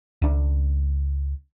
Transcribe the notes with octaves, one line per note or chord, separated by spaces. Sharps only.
C#2 D4